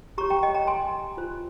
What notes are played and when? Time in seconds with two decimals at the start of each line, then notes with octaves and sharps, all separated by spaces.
0.18 G4 A#5 C#6
0.21 C#5
0.30 G5 A#5
0.43 D#5 G5
0.55 G5 A#5
0.67 G#5 C6
1.17 F4 C5